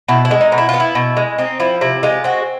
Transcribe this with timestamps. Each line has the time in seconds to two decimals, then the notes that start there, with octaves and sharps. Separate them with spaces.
0.08 B2 E4
0.25 E4
0.31 G#3
0.41 D#4
0.52 B2
0.58 E4
0.69 B3 F4
0.80 E4
0.95 B2
1.17 G#3
1.38 C4 D#4
1.60 F3 E4
1.81 C3 E4
2.03 G#3 F4
2.24 C4 F#4